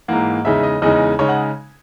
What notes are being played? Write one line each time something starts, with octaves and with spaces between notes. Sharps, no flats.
G#2 E3 A#3 F#5
E2 C#3 G#3 D#4 E5
D#5
E2 C#3 G#3 D#4 D#5
C#3 G#3 D#4 C#5
F#5